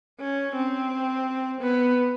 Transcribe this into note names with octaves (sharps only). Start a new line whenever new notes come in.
C#4
C4
B3